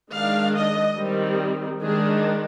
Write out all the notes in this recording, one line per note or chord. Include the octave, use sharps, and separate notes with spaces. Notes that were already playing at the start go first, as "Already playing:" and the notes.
D#3 G#3 D4 F5
D#5
D#3 G3 C4
D#3 G#3 D4 G#4